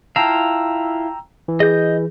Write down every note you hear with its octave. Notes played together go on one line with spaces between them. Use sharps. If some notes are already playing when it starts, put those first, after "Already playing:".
E4 F4 F5 G5 A5 A#5 E6
E3
G#4 D#5 G6